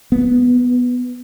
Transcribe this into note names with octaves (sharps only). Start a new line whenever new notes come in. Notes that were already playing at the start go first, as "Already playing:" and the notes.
B3